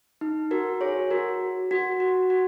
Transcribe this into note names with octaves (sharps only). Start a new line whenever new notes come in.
D#4
F#4 A#4
G#4 C#5
F#4 A#4
F#4
F#4
F#4